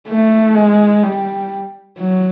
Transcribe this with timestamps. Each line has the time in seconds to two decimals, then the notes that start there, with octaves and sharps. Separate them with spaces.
0.08 A3
0.55 G#3
1.03 G3
1.98 F#3